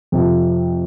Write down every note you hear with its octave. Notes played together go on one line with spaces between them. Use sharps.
F2 C3 F3